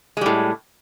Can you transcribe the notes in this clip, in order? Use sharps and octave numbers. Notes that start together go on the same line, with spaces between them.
A2 G3 G#3